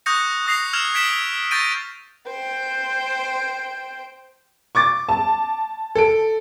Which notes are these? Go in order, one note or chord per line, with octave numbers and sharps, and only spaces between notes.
C#6 D#6 F#6 G6 A#6 C#7
D#6 A#6 C7 F7
E6 F6 G#6 E7 F7
G#6 B6 D7 E7 G7
C#6 G6 A6 A#6 D7 D#7
C5 G5
C#6 D6 A6
A5
A4 D7